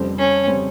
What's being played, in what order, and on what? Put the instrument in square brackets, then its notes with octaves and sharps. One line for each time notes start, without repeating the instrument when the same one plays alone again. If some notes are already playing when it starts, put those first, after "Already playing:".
Already playing: [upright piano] F1 F2 C#3 G3 C4
[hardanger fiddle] C#4
[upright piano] C#3 G3 C4